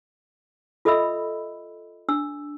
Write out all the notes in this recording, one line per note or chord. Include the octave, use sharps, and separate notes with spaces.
F4 A4 D#5 E5 B5 E6
D4 E6